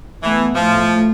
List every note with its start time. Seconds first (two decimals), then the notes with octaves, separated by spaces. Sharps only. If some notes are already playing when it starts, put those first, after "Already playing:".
0.23 E3 A3 B3
0.55 A2 F3 A3